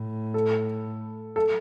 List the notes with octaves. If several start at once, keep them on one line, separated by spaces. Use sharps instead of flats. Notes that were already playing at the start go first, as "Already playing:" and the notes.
Already playing: A2
A4
A4